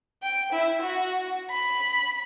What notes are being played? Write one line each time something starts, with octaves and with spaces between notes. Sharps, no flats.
G5
E4
F#4
B5